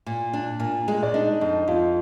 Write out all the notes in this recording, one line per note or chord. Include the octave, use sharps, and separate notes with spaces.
A#2
D4
A#2
G#3
D5
D4 D#4 D#5
F2
F2 F4 F5